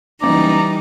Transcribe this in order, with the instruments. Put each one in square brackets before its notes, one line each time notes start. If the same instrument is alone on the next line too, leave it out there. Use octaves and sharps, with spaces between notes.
[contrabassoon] F#1 [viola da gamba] E3 G3 D#4 [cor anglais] D5 [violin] A#5